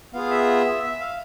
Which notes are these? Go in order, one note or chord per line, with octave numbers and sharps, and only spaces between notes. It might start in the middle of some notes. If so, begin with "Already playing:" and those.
B3 F4 G#4 F5
E5
E5
F5